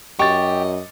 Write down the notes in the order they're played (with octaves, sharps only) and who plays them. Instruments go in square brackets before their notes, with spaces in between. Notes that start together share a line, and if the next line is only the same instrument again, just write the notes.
[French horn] F#2 [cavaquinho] G4 [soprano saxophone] D#5 [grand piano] C#6 A6